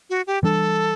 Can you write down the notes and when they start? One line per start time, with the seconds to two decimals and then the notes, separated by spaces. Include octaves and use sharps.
0.10 F#4
0.27 G4
0.43 E3 G3 D4 A4